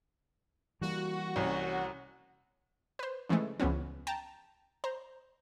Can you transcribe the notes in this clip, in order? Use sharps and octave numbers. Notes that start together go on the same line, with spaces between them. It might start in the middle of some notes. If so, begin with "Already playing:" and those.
E3 G3 A#3 F#4
C2 C#4
B4 C5
C#3 E3 F3 G#3 A3
C#2 E3 F3 B3 C#4
G5 A5 A#5
C5 A#5